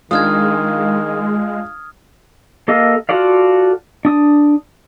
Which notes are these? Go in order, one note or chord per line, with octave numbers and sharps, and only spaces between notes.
D#3 G#3 D4 F4 D#6 F6 G#6
A#3 G4 A4 D#5 F5
F4 F#4 A4 D5 F5
D4 D#6